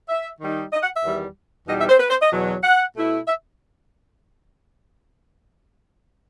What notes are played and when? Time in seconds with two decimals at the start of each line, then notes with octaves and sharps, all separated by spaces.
0.09 E5
0.40 D#3 G3 D#4
0.73 D#5
0.83 F#5
0.94 E5
1.04 E2 D#3 G3
1.68 E2 B2 G3 D#4 D#5
1.79 E5
1.89 C5
2.00 B4
2.10 C5
2.22 D#5
2.32 E2 B2 F#3
2.64 F#5
2.96 B2 A3 E4
3.28 E5